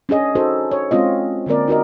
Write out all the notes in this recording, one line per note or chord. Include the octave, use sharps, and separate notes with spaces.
C#4 D4 G#4 D#5
D#4 F#4 A4 C5
C#5
G#3 C4 C#4 F4 D#5
D3 A#3 C4 A#4 D5
D#4 F#4 A#4 D#5